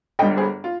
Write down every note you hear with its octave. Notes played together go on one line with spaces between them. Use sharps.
G1 G2 G3 D#5 G5
G#4 C5
F4